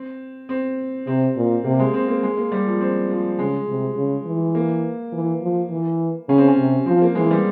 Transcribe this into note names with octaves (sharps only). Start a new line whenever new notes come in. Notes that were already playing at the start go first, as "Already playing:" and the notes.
Already playing: C4
C4
C3 C4
A#2
C3 A#3
G#3
C4
A#3
G#3
A#3
G3
F3
C4
F3
C#3 G#3
C3
C#3
E3
A#3
E3
F3
E3
C#3 C#4
C4
C#4
C3
F3 C4
A#3
E3 G#3
G3